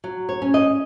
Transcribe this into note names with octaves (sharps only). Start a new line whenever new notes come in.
F#3
C#5
C#4
D#5